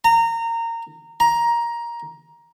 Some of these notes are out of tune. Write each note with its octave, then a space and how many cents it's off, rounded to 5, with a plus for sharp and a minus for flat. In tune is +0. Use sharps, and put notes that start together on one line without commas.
A#5 -20
A#5 +15